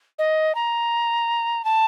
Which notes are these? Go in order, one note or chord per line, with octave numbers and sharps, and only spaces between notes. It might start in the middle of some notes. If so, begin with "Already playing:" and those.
D#5
A#5
A5